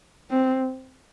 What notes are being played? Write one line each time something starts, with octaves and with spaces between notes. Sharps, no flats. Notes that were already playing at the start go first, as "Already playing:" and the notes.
C4